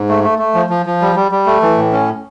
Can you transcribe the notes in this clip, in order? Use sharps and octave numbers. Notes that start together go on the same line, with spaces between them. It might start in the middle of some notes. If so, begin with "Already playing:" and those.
Already playing: G#2
A3
A3
A3
F3
F3
F3
G3
G3
G3
A3
E3
A2
C#4